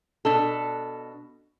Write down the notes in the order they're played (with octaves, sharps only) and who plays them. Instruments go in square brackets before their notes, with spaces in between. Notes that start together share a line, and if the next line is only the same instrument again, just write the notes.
[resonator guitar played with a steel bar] B2 D4 A4